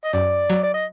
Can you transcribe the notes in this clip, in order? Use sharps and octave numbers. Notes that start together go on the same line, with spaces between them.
D#5
F#2 D5
F#3
D5
D#5